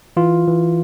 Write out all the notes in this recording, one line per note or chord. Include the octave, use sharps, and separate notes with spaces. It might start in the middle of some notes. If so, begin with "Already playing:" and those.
E3 F4
E3